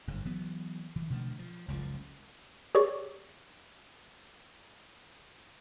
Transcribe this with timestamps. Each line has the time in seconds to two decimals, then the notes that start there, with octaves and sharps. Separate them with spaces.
0.08 G1 G#2
0.25 E3 F#3 B3
0.96 E3
1.10 B2 D3 F3 A3
1.39 F3
1.68 F#1 C#2 B2 F3
2.75 G4 G#4 C#5 D5 C#6